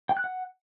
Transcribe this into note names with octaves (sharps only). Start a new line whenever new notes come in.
G5
F#6
F#5